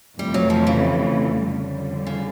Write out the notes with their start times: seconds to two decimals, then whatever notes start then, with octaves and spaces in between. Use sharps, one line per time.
0.19 F2 C3 E3 G3 A3
0.34 F#3
0.50 F3
0.67 C#3
1.44 F2 D3 G3
2.07 C#3